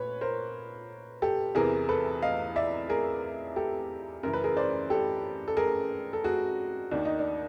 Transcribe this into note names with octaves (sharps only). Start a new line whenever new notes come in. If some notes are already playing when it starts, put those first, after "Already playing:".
Already playing: A#2 B4 C#5
A#4 C5
G4 A4
E2 C3 E3 G#4 A#4
A4 B4
D#5 F5
D5 E5
G#4 A#4
G4 A4
F#2 C#3 E3 A#4
B4
G#4 A#4
C5 D5
G4 A4
A4
G#4 A#4
A4
F#4 G#4
D#2 D#3 D4
D#4
D4